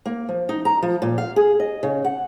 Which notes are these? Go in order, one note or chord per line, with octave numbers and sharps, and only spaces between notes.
A#3
F3
D#4
A#5
F3
A#2
F5
G#4
D#5
C#3
F#5